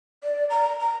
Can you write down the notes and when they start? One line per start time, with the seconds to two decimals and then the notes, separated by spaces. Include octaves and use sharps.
0.24 D5
0.50 A#5
0.81 A#5